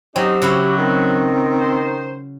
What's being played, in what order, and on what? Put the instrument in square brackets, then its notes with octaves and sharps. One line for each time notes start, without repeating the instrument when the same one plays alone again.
[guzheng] F#3 [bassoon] C4 [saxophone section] C#4 D#4 [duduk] G4
[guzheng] C#3 E4 F#4 [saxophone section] F#3
[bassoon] D#3 [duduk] C4
[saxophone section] C5